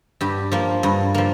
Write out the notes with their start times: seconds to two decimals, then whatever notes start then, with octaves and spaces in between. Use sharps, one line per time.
0.21 G2 G4
0.52 F3 A#3
0.83 G2
1.14 F3 A#3